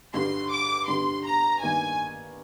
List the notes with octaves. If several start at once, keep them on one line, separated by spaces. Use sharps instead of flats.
G2 D3 G3 C6
D6
G2 D3 G3 C6
A#5
G2 D#3 A#3 D#4 G#5